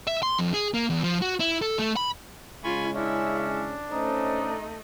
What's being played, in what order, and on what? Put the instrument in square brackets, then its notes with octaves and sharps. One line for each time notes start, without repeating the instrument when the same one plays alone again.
[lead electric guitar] E5
C6
F2
G#4
A#3
E2
F3
F#4
E4
A4
A3
B5
[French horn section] C#3 G#3 [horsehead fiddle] F4 [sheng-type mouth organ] G#5 B5 C#6
[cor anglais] C#4 [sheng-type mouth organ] D4 [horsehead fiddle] E4 E5
[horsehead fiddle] A3 D#5 [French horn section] C#4 C5 [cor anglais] D#4